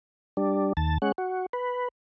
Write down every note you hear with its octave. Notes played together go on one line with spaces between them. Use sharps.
G3 D4
D#2 A5
G#3 C#4 F#5
F#4
B4